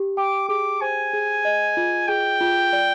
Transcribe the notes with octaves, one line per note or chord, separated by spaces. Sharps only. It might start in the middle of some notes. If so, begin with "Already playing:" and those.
Already playing: G4
G5 D6
G#4 D6
C5 G#5
G#4
D#5
F4
G#4 G5
F4
D5